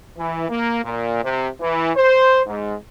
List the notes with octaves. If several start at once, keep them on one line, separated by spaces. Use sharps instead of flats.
E3
A#3
A#2
C3
E3
C5
G#2